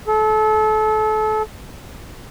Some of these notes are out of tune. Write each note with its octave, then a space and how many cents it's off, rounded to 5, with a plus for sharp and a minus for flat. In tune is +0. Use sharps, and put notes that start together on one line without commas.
A4 -30